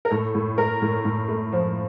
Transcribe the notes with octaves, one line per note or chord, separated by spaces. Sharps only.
A#4
A2 A4
A2
A2 A#4
A2
A2
A3
F3